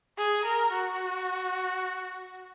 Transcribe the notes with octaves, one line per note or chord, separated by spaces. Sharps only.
G#4
A#4
F#4